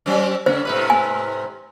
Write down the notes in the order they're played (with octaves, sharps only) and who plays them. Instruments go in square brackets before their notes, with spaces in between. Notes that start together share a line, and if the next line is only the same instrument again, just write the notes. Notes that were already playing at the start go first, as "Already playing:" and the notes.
[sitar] F#3 C4 C#4
[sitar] C#3 C#4 [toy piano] C5
[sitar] G#2 C3 B4
[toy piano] G#5